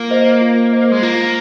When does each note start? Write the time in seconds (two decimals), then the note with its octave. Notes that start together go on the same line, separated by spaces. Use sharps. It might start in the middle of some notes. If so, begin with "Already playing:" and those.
Already playing: A#3 F4
0.10 C5 D#5
0.41 F4
0.72 C5 D#5
0.92 G#3
1.02 A#3 F4